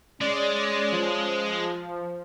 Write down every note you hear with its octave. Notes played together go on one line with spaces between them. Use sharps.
G#3 C#4 D5
F3